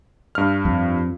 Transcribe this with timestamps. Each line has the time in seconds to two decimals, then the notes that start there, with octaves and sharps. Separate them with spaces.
0.35 G2 F6
0.65 F2